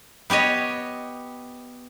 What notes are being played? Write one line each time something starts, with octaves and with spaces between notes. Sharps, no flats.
B3 G4 C#5 D#5